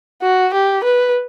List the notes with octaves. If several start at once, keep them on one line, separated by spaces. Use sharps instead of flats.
F#4
G4
B4